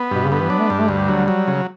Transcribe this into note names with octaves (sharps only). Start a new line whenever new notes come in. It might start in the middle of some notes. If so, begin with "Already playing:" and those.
Already playing: B3
G2 B2
C#3
D3 B3
E3
F#3 D4
A3
G2 G3
A3
D2 G3
F#3
F#3
C#3